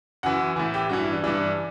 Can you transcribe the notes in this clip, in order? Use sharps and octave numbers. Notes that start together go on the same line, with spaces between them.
F#2 E3 F#5
A2 E3
G4
G2 E3 F#4
E4
D4
G2 E3 D4